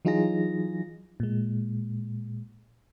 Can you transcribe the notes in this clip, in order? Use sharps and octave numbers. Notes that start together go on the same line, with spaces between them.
E3 F#3 D#4 F4 G#4 A#6
A#2 G#3